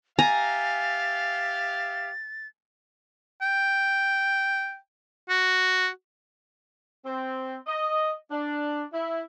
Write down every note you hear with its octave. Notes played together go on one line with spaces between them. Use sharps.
G4 E5 F5 G#5 A#5 A6
G5
F#4
C4
D#5
D4
E4